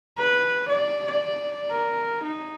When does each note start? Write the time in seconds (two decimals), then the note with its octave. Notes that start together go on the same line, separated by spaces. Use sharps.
0.18 B4
0.69 D5
1.71 A#4
2.23 D#4